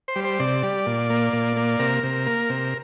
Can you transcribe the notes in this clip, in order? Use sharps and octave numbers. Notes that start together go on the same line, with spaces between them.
C5
G3
C5
C3 D5
G3
A#2
A#3
A#2
A#3
C3 A#4
C3
A#3
C3